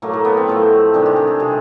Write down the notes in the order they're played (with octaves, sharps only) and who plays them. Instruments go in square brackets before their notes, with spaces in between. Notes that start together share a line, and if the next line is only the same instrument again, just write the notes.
[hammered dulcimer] A2 F#3 A3 A#3
A#3
B3
C4
A2 F3 A3
C3 D#3 G#3 D4
G4
G#4
A4
C3 F3 G#3 G#4